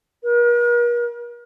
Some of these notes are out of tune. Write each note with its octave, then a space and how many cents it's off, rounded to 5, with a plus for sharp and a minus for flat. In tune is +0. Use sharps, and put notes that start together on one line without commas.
A#4 +45